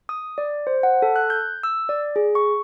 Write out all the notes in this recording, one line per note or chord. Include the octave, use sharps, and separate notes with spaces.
D#6
D5
C5
F#5
A4
F#6
G6
E6
D5
G#4
C#6